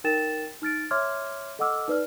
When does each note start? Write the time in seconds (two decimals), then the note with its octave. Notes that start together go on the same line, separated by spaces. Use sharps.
0.04 D#4 A#4 G5 A6 E7
0.62 D#4 F6 A6 D7
0.91 C#5 E5 C6 D6 F6 G#6
1.59 A4 D#5 F#5 D6 E6 F6
1.88 D#4 B4 D5 F6